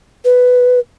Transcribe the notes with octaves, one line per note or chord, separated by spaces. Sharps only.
B4